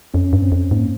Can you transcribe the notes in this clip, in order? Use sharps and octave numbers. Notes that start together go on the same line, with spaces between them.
F2 C#4
G2
C4
F2
G#2 A#3